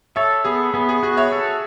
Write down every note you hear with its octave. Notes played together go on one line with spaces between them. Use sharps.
A4 C#5 E5
B3 G#4
B3 G#4
G#4
F#4 G#4
C#5 E5
A4